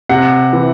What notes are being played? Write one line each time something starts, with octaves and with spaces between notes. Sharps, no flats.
C3 F#5
E3